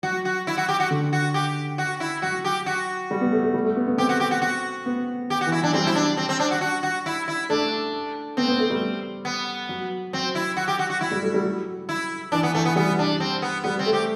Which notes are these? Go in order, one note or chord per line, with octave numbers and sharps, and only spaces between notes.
F#3 F#4
F#4
E4
F#4
G4
F#4
D3
F#4
G4
F#4
E4
F#3 F#4
G4
F#4
G3
B3
A3
A3
G3
A3
B3
B3
C4 G4
F#4
G4
F#4
F#4
B3
G4
F#4
E3
E4
F#3 D4
G3 C4
E4
D4
C4
C4
D4
F#4
F#4
F#4
E4
E4
A3 D4
B3 C4
B3
A3
G3
B3
F#3
F#3 C4
E4
F#4
G4
F#4
F#4
F#3 E4
G3
A3
G3
F#3
E4
E3 D4
B3
E3 A3
B3
G3 B3
D4
C4
B3
G3 B3
C4
A3
G4